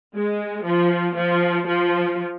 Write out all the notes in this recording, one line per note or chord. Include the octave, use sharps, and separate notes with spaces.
G#3
F3
F3
F3